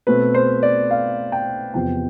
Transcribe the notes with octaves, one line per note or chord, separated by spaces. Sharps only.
B2 A3 C4 B4
C5
D5
F5
G5
E2 C3 F3 B3 G5